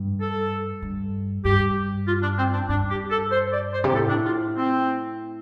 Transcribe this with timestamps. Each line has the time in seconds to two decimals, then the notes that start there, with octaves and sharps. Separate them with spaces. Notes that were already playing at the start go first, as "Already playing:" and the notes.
Already playing: G2
0.21 A4
0.82 G2
1.45 G2 G4
2.07 F4
2.22 D4
2.38 C4
2.53 D4
2.69 G2 D4
2.90 G4
3.11 A4
3.32 C5
3.52 D5
3.73 C5
3.84 C3
3.90 G4
3.93 A2 A4
4.09 D4
4.25 F4
4.56 C4